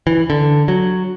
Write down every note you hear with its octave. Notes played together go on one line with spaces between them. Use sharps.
E3
D3
F#3